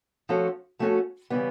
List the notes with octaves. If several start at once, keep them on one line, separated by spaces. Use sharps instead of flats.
F3 A3 C#4 F#4 A4
F3 A3 C#4 F#4 A4
C#3 E3 G3 B3